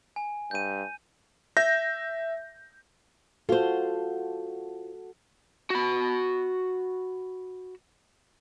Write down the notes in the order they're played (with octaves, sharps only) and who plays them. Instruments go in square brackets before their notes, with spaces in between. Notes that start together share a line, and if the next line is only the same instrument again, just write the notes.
[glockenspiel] G#5
[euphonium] G2 [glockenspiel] G6 D#7
[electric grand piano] E5 G6 A#6
[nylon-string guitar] F4 C5 [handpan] F#4 A4
[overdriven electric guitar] F#4 B5